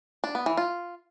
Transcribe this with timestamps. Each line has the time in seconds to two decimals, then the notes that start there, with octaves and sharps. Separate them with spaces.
0.24 D4
0.35 B3
0.46 E3
0.57 F4